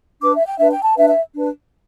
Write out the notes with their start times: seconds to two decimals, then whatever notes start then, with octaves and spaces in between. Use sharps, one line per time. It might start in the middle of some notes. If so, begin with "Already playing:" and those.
0.20 D4 B4 D6
0.34 E5
0.47 G5
0.58 D4 B4 E5
0.71 G5
0.84 A5
0.96 D4 B4 E5
1.10 E5
1.34 D4 B4